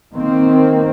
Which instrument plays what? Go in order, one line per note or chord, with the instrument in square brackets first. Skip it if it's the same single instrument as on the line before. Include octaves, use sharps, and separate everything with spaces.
[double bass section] D#3 A#3 C4